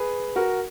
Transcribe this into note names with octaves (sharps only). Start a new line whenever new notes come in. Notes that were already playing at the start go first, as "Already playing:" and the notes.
Already playing: G#4 B4
F#4 A#4